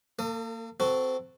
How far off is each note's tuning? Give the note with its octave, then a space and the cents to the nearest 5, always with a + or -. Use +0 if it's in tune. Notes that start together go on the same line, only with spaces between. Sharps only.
A#3 -25 A4 +40 D#6 +0
C4 -20 F#4 +0 A4 +0